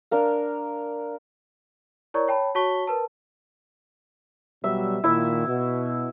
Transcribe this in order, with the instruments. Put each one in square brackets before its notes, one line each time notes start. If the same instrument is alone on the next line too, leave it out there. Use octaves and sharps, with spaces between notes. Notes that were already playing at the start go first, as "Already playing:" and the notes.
[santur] D4 A#4 F5
[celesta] E4 A#4 C#5 D5 A#5 C#6
C#5 G5 A5 B5
F#4 C#5 A5 C#6 B6 G7
A#4 B4 A5
[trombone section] B2 F#3 G3 [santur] E5
[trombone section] A#2 D#3 [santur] E4 E5
[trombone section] B2